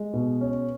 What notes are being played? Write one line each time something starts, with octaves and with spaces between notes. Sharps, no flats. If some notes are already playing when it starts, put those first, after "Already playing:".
Already playing: G#3
B2
C#4